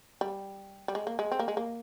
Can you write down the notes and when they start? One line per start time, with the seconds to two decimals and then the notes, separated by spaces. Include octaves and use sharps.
0.21 G3
0.88 G3
0.95 G#3
1.07 A#3
1.19 G#3
1.32 C4
1.39 A#3
1.48 G#3
1.57 A#3